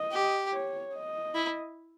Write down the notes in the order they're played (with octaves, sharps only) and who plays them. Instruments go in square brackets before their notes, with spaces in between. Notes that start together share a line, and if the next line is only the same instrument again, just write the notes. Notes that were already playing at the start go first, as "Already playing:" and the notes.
Already playing: [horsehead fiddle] D#5
[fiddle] G4
[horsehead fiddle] C#5
D#5
[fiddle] E4